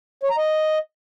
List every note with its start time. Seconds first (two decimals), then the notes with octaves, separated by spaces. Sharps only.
0.23 C#5
0.31 A#5
0.38 D#5